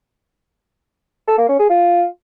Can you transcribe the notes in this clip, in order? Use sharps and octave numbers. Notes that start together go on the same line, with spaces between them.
A4
A#3
C#4
G#4
F4